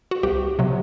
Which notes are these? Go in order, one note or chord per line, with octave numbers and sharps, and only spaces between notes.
F#4
C2 G4
C3 F#3